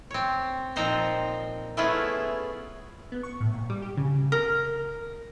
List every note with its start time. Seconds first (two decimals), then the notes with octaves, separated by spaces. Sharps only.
0.11 C4 C#5
0.76 A#2 F3 C4 D#4 C5 A#5
1.77 A3 B3 C#4 E4 F4 G#4
3.12 B3
3.23 C#6
3.40 A2
3.54 A#2
3.70 G3
3.82 G4
3.97 C#3
4.32 A#4